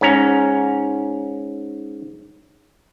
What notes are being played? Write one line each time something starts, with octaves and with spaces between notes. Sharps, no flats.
G#2 C#4 A#5